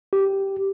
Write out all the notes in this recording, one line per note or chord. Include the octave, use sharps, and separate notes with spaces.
G4